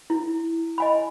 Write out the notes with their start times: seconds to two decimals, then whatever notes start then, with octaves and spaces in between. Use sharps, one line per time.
0.10 E4
0.78 D#5 G#5 B5